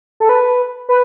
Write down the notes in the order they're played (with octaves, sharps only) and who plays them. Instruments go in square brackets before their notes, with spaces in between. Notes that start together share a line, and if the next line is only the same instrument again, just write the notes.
[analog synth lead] A4
B4
B4